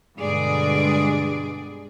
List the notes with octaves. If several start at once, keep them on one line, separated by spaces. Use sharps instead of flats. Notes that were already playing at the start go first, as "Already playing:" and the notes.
G2 B2 D3 G#3 G#4 D5